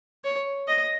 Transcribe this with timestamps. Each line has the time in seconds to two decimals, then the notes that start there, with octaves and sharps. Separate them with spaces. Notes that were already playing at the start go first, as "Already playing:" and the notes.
0.24 C#5
0.68 D#5